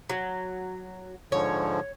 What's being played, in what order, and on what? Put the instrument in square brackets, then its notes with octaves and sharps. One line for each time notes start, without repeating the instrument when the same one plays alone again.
[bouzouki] F#3
[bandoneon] G#2 D3 F3 [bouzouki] C#5